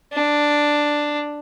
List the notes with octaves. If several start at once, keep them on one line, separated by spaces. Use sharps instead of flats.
D4